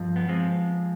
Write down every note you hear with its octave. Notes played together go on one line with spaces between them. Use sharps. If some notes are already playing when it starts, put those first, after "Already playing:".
Already playing: G2 F3
B3
F3 G#3 C4